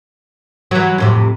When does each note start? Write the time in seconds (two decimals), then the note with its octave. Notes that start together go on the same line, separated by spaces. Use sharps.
0.71 E3 F#3
0.98 F2 A2 C3